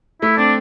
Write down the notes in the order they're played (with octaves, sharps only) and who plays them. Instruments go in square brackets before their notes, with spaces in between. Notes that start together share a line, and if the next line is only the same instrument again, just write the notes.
[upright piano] A3 [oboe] E4
[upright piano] C4 [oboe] D4